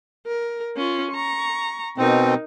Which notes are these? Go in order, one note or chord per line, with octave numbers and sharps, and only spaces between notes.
A#4
C#4 F4
A#5 C#6
B2 C4 D#4 A#4